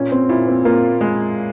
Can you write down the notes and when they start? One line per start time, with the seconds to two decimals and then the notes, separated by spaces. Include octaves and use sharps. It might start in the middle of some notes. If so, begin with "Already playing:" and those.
Already playing: A#2 C#4
0.12 C4
0.29 A#2 E4
0.48 C4
0.65 A#3 F4
1.01 G#3